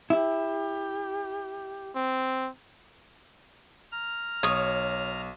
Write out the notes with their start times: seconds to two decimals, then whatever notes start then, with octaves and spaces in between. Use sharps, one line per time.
0.10 E4 G4
1.96 C4
3.92 A#5 F6
4.43 B1 C#5 D#6